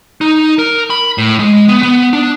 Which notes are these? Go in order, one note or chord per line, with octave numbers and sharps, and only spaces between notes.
D#4
A#4
B5
A2
G#3
B3
B3
D4